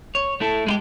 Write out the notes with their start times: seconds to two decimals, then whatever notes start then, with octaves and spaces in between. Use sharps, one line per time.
0.15 C#5
0.40 A3 E4 A4
0.67 G#3 E4 G4